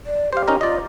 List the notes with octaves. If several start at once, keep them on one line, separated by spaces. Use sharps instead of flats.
D5
G4 C5 F5
C#4 D#4 A#4
F4 D5 D#5